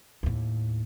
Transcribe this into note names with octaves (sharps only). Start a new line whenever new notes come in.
D#2 A2